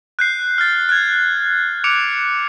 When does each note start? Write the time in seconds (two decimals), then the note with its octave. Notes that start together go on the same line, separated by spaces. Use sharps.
0.19 F#6 G6 C7
0.58 F6 A6
0.89 F#6 G#6
1.84 D6 C#7 D7 F7